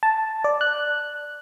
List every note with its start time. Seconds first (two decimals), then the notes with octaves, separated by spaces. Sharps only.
0.03 A5
0.44 D5
0.61 F#6